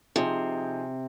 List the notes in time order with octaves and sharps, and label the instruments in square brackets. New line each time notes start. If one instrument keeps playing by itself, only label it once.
[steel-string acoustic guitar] C3 [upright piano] F3 C4 D#4 G#4 C5